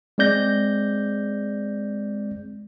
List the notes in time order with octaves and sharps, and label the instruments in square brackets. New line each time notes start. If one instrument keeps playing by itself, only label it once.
[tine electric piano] G#3 C4 D5 G6 A#6